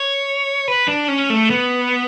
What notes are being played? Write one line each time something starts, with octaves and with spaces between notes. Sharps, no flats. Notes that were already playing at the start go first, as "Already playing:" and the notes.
Already playing: C#5
B4
D4
C#4
A3
B3